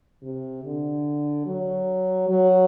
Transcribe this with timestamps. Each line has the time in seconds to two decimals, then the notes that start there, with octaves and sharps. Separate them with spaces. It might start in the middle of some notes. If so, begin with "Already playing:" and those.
0.23 C3
0.64 D3
1.46 F#3
2.29 F#3